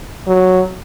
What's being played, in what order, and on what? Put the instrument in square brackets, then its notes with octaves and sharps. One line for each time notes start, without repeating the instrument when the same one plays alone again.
[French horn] F#3